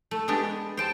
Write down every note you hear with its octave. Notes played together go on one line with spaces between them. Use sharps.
A3
G#3 B3 D4 G4
C5 G5 A5